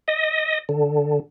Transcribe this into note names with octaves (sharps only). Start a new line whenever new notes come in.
D#5
D3